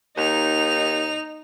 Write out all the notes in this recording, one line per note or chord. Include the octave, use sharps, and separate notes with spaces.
D#2 D#4 F7